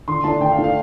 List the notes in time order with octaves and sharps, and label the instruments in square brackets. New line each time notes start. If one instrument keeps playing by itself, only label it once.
[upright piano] D3 C6
A3 D4 A5
D3 G5
F5
A3 D4
F5